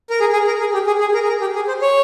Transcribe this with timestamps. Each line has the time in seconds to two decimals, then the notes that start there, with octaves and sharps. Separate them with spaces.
0.10 A#4
0.20 G#4
0.33 G#4
0.47 A#4
0.60 G#4
0.73 G4
0.87 G#4
1.00 G#4
1.14 A#4
1.23 G#4
1.28 A#4
1.41 G4
1.55 G#4
1.68 C5
1.82 C#5